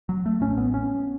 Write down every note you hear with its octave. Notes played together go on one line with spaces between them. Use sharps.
F#3
A3
A1 A2 C#4
B3
C#4